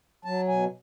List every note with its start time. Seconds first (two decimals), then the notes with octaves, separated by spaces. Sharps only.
0.25 F#3 A5
0.48 B2 G#5